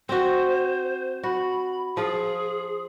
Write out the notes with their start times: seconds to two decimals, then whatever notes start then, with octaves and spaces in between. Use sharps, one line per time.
0.09 C4 F#4 C5
1.23 F#4 B5
1.97 F3 F4 G#4